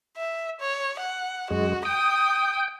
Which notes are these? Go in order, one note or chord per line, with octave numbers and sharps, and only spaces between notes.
E5
C#5
F#5
F#2 G#3 F#4
G5 D#6